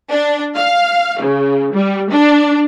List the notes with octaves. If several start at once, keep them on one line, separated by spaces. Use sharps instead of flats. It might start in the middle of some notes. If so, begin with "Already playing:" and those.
D4
F5
C#3
G3
D4